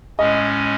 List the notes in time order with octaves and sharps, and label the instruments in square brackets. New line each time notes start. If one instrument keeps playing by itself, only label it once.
[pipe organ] A2 G#3 C#4 [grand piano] D#5